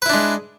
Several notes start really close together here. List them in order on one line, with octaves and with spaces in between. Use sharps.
B4 E4 D4 G#3